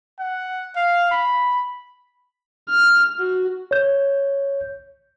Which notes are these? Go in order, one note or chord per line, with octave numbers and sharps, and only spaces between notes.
F#5
F5
B5
F6
F#4
C#5 G6